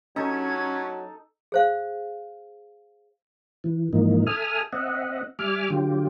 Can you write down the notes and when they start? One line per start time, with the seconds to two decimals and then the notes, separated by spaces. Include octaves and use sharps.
0.16 F#3 C#4 D#4 A4 G#6
1.52 G#4 C5 F5
3.64 E3
3.93 G#2 E3 F3 A#3 D#4
4.27 A4 E5 G#5 D#6 F6
4.73 C4 D#5 E5 F#5
5.39 G3 E5 G#5 D6 F6
5.70 D3 F#3 F4 G4